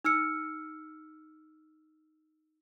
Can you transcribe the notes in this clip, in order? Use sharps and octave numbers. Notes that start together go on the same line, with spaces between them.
D#4 E6 F6 C#7